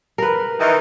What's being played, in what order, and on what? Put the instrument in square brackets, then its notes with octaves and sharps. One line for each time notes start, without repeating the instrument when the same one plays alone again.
[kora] A#4 B4
[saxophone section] D#3 E3